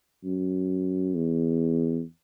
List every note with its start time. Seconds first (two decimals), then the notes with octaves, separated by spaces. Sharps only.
0.24 F#2
1.15 E2